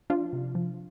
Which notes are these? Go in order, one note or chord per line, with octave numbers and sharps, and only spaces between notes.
F3 D4 F4
C3
F3